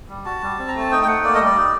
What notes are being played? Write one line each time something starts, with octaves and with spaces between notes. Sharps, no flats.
G3
F#4 A5
G3
C4
A#5
A3 A5
D#4 G5
G5
A3 F#5
A#3 D5
D#5
G3 D5
D#4